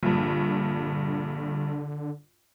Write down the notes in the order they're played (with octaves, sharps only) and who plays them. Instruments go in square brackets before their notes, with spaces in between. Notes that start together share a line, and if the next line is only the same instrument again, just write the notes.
[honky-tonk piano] A#1 G2 [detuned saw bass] D3